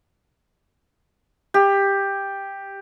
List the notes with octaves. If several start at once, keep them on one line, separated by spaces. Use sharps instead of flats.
G4